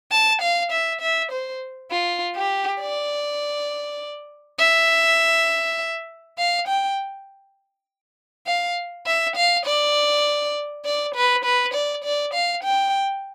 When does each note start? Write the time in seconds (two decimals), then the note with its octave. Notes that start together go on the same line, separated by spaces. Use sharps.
0.12 A5
0.42 F5
0.72 E5
1.01 E5
1.31 C5
1.91 F4
2.36 G4
2.80 D5
4.59 E5
6.38 F5
6.68 G5
8.47 F5
9.06 E5
9.36 F5
9.66 D5
10.85 D5
11.15 B4
11.45 B4
11.74 D5
12.04 D5
12.34 F5
12.64 G5